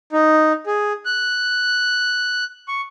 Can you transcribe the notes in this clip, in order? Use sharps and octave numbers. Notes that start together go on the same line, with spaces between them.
D#4
G#4
F#6
C#6